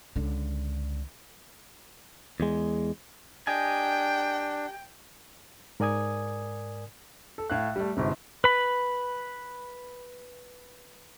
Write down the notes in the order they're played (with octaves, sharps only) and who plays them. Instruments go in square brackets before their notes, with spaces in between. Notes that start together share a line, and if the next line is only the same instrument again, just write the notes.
[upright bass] C#2 D3
[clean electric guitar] E2 G#3
[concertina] D4 [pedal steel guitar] G4 D#5 G#5 [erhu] G5
[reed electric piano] G#2 A#4 D5 G#5 D#6 G#6
[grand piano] A4
A2 F5 F#6
G3 A3
G1 G#2 C3
[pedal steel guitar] B4 B5